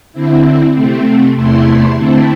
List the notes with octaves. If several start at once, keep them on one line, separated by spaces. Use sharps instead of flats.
D3 C4 E4
C3 A3 C4
E2 C3 A3 E4 C6
D3 A3 C4 E4 A5